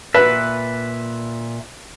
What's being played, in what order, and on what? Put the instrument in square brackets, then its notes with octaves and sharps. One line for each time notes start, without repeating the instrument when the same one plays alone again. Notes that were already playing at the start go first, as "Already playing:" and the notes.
[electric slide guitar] A#2 E5 [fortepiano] B4